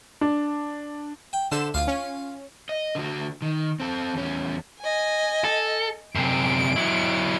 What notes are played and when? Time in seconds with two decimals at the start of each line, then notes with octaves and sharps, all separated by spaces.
0.21 D4
1.33 G5
1.52 D3 A4 C5 E5 E7
1.74 D2 F4 F5
1.88 C#4
2.69 D#5
2.95 D3 F#4
3.42 D#3
3.80 C4 A4
4.14 E2 C#4
4.81 D#5 G#5
5.44 A4
6.15 F#2 C3 D7
6.76 F#3 E4